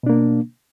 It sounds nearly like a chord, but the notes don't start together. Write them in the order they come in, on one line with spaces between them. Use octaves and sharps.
B2 D4 A#3